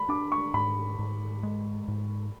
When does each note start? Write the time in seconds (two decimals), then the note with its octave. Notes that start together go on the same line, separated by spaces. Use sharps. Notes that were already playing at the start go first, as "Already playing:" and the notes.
Already playing: B5
0.09 D4 D6
0.32 C#6
0.54 G#2 B5
0.99 G#2
1.43 G#3
1.88 G#2